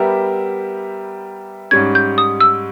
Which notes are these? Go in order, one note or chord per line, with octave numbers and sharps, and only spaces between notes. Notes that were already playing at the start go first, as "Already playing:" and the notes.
Already playing: G3 B3 G4 A#4 E5
G#2 G3 C#4 G#6
G6
D#6
E6